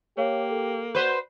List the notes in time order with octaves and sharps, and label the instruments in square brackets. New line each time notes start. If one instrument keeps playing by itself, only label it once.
[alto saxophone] A#3 [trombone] G4 [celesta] C#5 F5
[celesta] A4
[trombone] F#4 [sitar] B4 C5